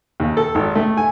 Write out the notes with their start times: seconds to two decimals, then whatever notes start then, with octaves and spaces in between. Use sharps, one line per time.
0.20 D#2
0.37 A4
0.55 G#1
0.75 A3
0.97 G#5